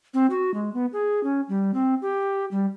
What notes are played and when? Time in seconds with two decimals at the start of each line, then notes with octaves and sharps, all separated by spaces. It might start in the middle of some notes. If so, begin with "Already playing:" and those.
0.14 C4
0.30 F#4
0.54 G#3
0.74 B3
0.93 G#4
1.24 C#4
1.49 G3
1.74 C4
2.02 G4
2.51 G3